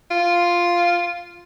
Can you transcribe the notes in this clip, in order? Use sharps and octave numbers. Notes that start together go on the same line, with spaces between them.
F4